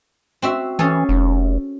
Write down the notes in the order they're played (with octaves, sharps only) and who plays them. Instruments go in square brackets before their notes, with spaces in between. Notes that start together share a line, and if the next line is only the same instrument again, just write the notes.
[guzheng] C4 F#4 E5
[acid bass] E3 [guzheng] C#4 G#4 A4
[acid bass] F1